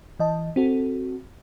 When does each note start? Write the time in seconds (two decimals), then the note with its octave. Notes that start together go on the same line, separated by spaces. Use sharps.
0.20 E3 D#5 A5
0.56 C4 F#4 A4